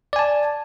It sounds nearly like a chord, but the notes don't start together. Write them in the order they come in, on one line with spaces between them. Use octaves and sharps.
D5 G#5 A5